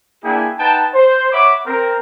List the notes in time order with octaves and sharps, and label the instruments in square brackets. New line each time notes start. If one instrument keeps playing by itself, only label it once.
[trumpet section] A#3 D4 E4 G#4 G5 G#5
D#4 B4 F#5 G5 A5
C5
C#5 E5 F#5 B5 D6
C4 A#4